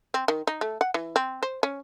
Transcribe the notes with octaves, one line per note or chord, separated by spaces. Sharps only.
C4
D#3
D#4
A3
F#5
E3
C4
C5
C#4